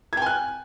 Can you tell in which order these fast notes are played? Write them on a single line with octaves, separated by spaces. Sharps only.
G#6 G5 G#5 F#6